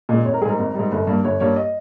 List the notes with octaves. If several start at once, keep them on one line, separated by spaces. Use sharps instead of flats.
A#2 G#3 D#5
G#1 C#5
A#4
G#2 G3 G#4 A#4
G#1
G#2 G3
G1
G2 G3 A#3
G1 C#5
G2 G3 A#3 C#5
D#5